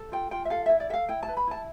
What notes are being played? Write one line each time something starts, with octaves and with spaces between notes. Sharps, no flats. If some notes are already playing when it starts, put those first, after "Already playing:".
Already playing: A4
F4 G5
F4 G5
E5
A4 F5
E4 E5
D5
A4 E5 F5
E4 G5
A5
B4
B5
E4 A5